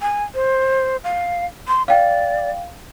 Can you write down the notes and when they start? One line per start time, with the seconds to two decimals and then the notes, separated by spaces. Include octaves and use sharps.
0.02 G#5
0.35 C5
1.04 F5
1.68 C6
1.88 D5 F5 G5